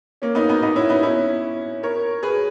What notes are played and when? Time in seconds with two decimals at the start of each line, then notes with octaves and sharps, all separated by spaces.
0.22 A#3 C#4
0.35 B3 D#4
0.49 B3 D#4
0.62 B3 D#4
0.76 C#4 E4
0.89 B3 D#4
1.02 C#4 E4
1.83 A#4 C#5
2.23 G#4 B4